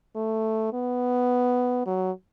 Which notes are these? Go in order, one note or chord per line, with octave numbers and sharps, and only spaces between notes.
A3
B3
F#3